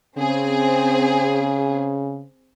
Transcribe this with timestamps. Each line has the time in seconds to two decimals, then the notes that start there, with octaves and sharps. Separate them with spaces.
0.18 C#3 C4 G#4